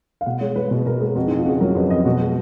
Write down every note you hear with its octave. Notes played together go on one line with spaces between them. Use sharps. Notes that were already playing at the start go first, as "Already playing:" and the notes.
F5
B2 F#5
G#3 C#5
G#3 B4
B2 B4
B2 A#4
G#3 G#4
F2 F#4
F2 D#4
F4
C#3 F#4 G#4
F#3 A#4
F2 B4
F2 D#5
B2 F#4
G#3